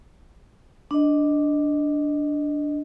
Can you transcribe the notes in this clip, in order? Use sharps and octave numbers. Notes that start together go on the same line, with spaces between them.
D4 D#5